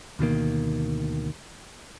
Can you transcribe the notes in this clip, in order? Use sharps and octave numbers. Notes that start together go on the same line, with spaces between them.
D2 B2 D#3 A#3